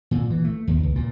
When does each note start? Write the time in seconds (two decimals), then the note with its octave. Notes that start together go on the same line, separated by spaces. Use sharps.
0.11 A#2
0.30 E3
0.45 A3
0.68 D#2
0.83 C#2
0.96 A#2